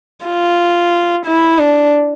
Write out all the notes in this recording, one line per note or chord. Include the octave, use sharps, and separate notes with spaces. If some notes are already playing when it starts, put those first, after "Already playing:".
F4
E4
D4